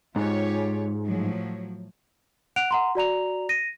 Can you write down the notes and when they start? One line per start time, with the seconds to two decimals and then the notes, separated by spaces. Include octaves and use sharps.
0.16 G#2 F4 G4 C#5
1.07 A2 F3 F#3
2.56 F#5 F#6 D7 F7
2.71 F#5 A#5 C6
2.95 F#4 D5 A#5 F7
3.49 A#6 D#7